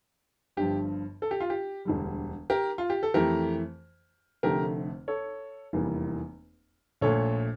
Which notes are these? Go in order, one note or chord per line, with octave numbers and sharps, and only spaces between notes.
G1 G2 F3 G4
A4
G4
F4
G4
E1 D2 D3 G3
G4 A#4
F4
G4
A4
F2 E3 A3 G4 A#4
F1 F2 D3 A3 G4 A#4
A4 C#5
F1 E2 E3 G3 A#3
A#1 A#2 A3 A4 C#5